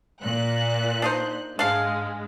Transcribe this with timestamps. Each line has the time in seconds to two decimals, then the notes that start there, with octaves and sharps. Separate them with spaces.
0.22 A#2 F#6
1.02 D4 D#4 C5
1.59 G#2 G#3 D4 F5